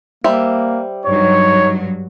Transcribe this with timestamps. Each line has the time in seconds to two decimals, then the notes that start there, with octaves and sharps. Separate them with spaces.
0.24 G3 A#3 C5 E5
1.06 G2 F#3 D#4 C#5